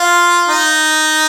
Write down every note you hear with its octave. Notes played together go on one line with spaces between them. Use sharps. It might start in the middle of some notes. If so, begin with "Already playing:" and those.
Already playing: F4
D#4